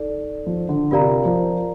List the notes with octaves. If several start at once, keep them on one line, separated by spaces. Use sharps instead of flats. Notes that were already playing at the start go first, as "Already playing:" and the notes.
Already playing: D#4 A4 D5
F3
D3
C3 F4 A#4 D5 F5 A#5
F3